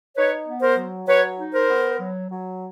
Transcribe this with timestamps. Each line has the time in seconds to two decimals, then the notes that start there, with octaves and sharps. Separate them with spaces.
0.16 D#4 B4 C#5
0.46 B3
0.61 A#4 C5
0.77 F#3
1.07 F#3 B4 C#5
1.38 D#4
1.53 A#4 C5
1.68 B3
1.99 F#3
2.29 F#3